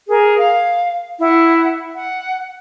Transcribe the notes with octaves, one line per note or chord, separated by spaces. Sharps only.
G#4 A#4
F5
E4 F#5
F#5